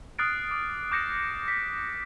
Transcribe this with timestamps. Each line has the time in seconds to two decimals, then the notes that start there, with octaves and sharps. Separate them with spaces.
0.19 D#6 F6 F#6 A6 C7 D7
0.51 D6
0.92 D6 G6 A#6 C#7 E7
1.48 B6